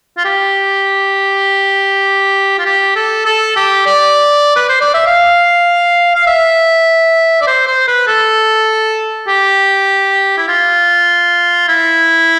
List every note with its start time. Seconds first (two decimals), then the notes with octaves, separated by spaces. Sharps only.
0.18 F4
0.25 G4
2.59 F4
2.65 G4
2.96 A4
3.26 A4
3.56 G4
3.86 D5
4.56 B4
4.69 C5
4.81 D5
4.94 E5
5.07 F5
6.15 F5
6.27 E5
7.42 D5
7.47 C5
7.67 C5
7.88 B4
8.07 A4
9.28 G4
10.38 E4
10.48 F4
11.68 E4